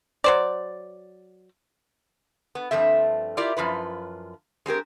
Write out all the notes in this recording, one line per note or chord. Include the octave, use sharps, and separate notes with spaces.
F#3 C5 D5
B3
G2 F3 A3 C4 E5
E4 F4 G4 A#4 D5
F#2 F3 F4 B4
G#3 C4 G4 A#4